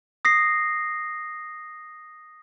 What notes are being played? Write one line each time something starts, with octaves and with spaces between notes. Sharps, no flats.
D#6 A#6 C7